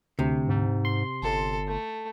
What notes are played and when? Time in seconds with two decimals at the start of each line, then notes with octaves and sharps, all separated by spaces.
0.19 D2 C3
0.48 G#2
0.85 C6
1.23 G1 A4
1.68 A3